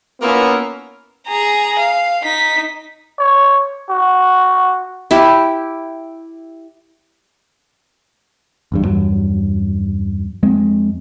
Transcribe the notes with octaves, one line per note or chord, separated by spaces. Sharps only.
A#3 B3 C#4 E4 F4 A#4
G#4 A#5
F5
D#4 B6
C#5
F#4
E4 G4 E5
G1 E2 G2
E2 G2 F#3
F2 G#3 C4